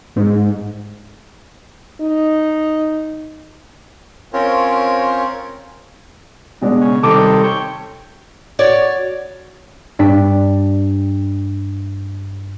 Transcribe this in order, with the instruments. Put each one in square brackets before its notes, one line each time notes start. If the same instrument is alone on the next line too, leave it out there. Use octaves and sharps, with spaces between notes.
[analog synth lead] G#2
[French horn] D#4
[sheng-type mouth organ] C4 C#4 F4 A#4 C5 C#5
[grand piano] B2 G#3 D4
[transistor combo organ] C#3
[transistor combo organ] C3 D#3 G3 [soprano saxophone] A4 [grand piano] D6
[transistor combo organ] C#5 G5
[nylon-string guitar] F#4 C#5 D5
[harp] G2 D4 C#6 B6